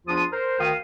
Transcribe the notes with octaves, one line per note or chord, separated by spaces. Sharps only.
E2 F3 D4 F4 D#6
A#4 C5
D2 D#3 A#4 F5 G5 D#6